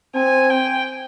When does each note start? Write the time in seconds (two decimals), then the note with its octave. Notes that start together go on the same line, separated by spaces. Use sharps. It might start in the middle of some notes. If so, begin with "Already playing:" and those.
0.15 C4 G#5
0.50 G5